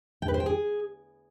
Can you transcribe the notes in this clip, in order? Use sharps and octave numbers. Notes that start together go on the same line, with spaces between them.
G5
B4
C5
G5
G#4